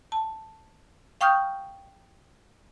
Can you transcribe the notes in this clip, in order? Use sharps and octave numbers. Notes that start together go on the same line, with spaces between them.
A5
F5 G5 C#6 D#6 F6 G6